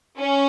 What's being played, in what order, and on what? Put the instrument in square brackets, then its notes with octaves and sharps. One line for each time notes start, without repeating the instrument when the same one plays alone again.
[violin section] C#4